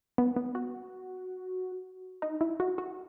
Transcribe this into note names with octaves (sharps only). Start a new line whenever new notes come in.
B3
B3
F#4
D#4
E4
F#4
F#4